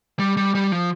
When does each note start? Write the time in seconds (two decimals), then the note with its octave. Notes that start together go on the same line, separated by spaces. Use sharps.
0.19 G3
0.37 G3
0.55 G3
0.72 F3